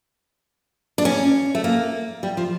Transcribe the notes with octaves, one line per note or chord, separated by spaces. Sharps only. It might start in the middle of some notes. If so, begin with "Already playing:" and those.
D4
C#4
A3
A#3
G3
F3